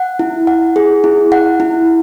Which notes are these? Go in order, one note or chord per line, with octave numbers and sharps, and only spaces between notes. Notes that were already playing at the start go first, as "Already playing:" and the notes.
Already playing: F#5
E4
F#5
G#4
E4
F#5
E4